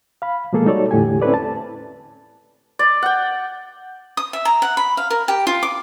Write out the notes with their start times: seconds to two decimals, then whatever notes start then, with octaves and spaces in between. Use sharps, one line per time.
0.22 F5 B5
0.53 B2 F3 G#3 A#3 G#4 A4
0.66 G3 D#4 F#4 A4 C#5 D5
0.91 E2 A2 D3 G4 G#5
1.22 C4 C#4 E4 A4 B4 D5
1.34 A5
2.79 D5
3.02 F#5 G5
4.17 D#6
4.33 E5
4.45 A#5
4.62 F#5
4.77 B5
4.97 F5
5.10 A#4
5.28 G4
5.47 F4
5.63 D6